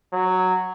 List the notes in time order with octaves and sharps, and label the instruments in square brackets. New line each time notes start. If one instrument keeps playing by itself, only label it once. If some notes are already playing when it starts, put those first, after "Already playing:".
[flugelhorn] F#3